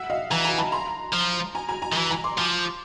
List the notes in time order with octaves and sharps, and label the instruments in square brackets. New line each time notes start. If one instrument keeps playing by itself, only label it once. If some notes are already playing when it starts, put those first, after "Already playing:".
Already playing: [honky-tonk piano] E5 F#5
D#5 F5
[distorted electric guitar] E3 [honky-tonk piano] G#5 A#5
[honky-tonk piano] G#5 A#5
A5 B5
A#5 C6
[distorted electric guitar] F3
[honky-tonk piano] G#5 A#5
G#5 A#5
G#5 A#5
[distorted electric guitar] D#3
[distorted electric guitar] E3 [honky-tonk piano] G#5 A#5
[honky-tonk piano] G#5 A#5
C6 D6
[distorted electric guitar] F3